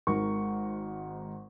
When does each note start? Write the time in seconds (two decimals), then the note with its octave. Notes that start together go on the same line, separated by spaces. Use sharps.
0.07 G#1 G#2 D#3 A#4 A#5 C#6